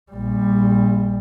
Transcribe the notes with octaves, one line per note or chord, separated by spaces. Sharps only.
A#1 G3